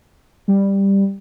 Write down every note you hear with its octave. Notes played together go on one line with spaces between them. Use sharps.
G3